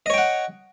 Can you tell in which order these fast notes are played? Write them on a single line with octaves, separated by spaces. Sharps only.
D#5 C#5 G5 F#5